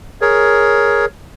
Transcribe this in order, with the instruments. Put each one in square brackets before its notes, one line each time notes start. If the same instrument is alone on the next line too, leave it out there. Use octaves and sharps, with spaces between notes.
[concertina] G#4 A#4 C#5